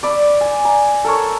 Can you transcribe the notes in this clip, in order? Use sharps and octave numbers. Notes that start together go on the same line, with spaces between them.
D5 B5 E6
G#5
A#5
A4 A#4 C#5